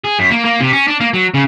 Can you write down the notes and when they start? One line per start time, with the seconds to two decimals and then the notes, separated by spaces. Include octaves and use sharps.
0.04 G#4
0.19 F#2
0.31 A#3
0.45 A#3
0.60 C3
0.73 C#4
0.88 D4
1.00 A#3
1.14 F#3
1.34 C#3